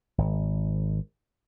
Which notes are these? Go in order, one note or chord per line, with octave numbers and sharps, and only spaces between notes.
G#1